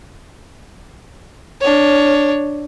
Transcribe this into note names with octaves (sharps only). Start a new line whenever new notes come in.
D4 C#5